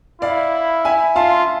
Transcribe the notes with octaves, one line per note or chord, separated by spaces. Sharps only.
E4 D5 F5
E5 G#5
F4 F5 A5